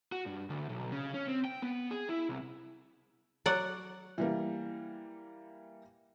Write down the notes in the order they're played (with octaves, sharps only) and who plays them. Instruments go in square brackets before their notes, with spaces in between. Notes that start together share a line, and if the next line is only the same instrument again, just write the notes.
[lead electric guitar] F#4
G2
D2
B1
C#3
C#4
C4
G5
B3
G#4
E4
C2
[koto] F#3 D5 F#5
[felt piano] E3 G3 A#3